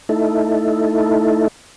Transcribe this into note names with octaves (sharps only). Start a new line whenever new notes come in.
A3 D#4 E4 A4